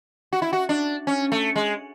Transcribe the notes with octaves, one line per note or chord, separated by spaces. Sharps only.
F#4
E4
F#4
D4
C#4
A3
G#3